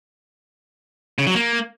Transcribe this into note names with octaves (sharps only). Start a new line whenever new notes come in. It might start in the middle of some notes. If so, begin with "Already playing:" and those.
C#3
F#3
A#3